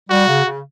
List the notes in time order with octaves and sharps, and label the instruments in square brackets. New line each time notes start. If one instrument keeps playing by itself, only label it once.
[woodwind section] G3 [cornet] F#4
[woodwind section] C#3
C#3